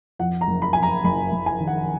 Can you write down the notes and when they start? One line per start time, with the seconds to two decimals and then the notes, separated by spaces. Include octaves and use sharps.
0.19 F2 F#5
0.41 A#5
0.48 F#1
0.62 B5
0.73 F2 G#5
0.83 A#5
1.04 F#1 B5
1.32 F#1
1.46 G#5
1.60 D#3
1.67 F#5